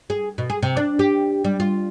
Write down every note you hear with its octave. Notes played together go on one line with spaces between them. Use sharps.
G#4
B2
G#4
C3
D4
G4
G3
F4